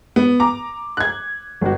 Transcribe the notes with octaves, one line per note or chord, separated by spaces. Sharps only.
B3
A#5 D6
F#6 G#6
G1 F#4